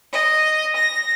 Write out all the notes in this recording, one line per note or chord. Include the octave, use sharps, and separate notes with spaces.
D#5
A#6